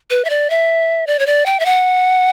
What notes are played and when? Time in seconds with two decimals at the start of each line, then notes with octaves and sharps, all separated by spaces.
0.10 B4
0.25 E5
0.30 D5
0.50 E5
1.07 D5
1.19 C#5
1.27 D5
1.46 G5
1.60 E5
1.66 F#5